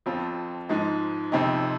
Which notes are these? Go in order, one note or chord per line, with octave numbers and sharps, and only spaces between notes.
F2 F3 C4 F4
G#2 F3 G#3 D#4
F2 C3 F3 C4 D#4